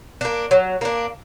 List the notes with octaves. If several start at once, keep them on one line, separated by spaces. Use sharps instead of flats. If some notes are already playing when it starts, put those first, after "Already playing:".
A#3 D4
F#3
A#3 D4